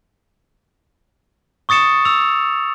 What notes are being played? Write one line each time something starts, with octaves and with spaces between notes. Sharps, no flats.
C#6 D#6 A6 C#7 E7
E6 F7